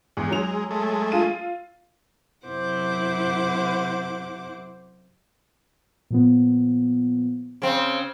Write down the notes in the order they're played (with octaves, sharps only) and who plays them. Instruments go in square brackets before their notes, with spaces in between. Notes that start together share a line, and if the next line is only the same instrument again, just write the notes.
[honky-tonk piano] E2 [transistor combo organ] G#3
[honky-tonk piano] F#3 F7
[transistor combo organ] G#3 A3
[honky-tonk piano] F4 D#7
[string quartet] F#2 C3 E4 C5 F#5 D6
[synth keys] A#2 F3 B3
[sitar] C#3 C4 [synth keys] D7